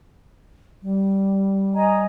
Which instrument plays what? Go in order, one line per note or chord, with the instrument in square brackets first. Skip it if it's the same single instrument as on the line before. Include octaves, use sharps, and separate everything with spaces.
[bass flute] G3
[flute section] D#5 G#5 A#5